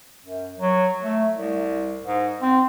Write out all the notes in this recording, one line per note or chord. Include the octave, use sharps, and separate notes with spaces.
F#2
F#3
A3
C2
G#2
C4